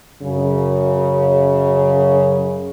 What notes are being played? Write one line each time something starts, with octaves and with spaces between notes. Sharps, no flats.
F#2 C#3